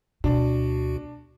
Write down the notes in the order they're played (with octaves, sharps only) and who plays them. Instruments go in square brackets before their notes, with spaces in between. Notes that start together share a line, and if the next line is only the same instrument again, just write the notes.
[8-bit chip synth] D2 F#4 [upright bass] B2 [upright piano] D4